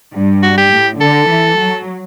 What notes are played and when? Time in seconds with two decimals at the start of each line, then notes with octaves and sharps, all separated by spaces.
0.15 G2
0.43 F#4
0.58 G4
0.72 A2
1.00 D3 A4
1.29 E3
1.58 F#3